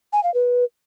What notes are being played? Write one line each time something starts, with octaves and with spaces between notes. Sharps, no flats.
G#5
F5
B4